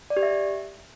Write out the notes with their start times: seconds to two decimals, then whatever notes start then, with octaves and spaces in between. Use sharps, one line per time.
0.10 D5
0.17 G4
0.23 E5